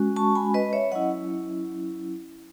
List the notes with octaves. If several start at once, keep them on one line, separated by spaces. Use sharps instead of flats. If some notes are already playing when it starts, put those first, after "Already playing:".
Already playing: G#3 C#4 F#4
A5 C#6
G#5 B5
B4 D#5
C#5 E5
F#3 C#4 E4 D#5 F#5